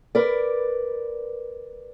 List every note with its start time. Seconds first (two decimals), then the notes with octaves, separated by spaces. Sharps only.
0.15 A#4 B4 D5